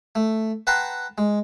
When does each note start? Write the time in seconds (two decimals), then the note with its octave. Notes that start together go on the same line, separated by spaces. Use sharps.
0.15 A3
0.67 B4 F#5 G5 A5 A#5 C6
1.18 G#3